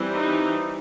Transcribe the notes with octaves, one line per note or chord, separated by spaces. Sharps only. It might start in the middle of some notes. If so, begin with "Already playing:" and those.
Already playing: E3 G3 C4
D#4